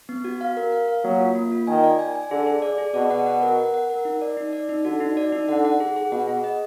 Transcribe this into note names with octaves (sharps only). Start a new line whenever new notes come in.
B3
F#4
F5
A#4
F5
F5
F#3 A#3
F4
A#3
F4
D#3 G#5
D5
G#5
G#5
D3 G#4
G#4
D5
G#4
B2 D5
F#5
F#5
A#4
F#5
F#5
A#4
D#4
D5
D#4
D5
D#4
D3 F#4
D#4
D5
D#4
D3 F#5
F#5
G#4
G#4
B2 F#5
G#4
D#5